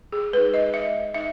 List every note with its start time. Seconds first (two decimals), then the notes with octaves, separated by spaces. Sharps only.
0.12 G#4
0.33 G#3 B4
0.37 D#4
0.54 D#5
0.73 G#3 E5
1.14 D#4 E5